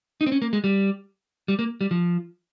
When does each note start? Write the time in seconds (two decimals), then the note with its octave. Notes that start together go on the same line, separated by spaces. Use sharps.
0.21 D#4
0.26 C4
0.32 C#4
0.42 A#3
0.53 G#3
0.64 G3
1.48 G3
1.59 A#3
1.81 G3
1.91 F3